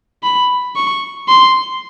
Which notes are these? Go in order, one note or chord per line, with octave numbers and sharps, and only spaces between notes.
B5
C#6
C6